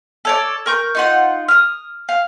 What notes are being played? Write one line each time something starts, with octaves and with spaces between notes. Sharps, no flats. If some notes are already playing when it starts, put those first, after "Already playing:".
A4 C#5 D5
A#4 C#6 G6
D#4 F4 F#5
D#6 F6
F5